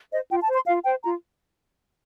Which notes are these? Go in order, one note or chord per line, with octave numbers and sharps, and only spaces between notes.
C5 D#5
F4 G5
A5
C5
C6
F4 F5
C5 G5
F4 A#5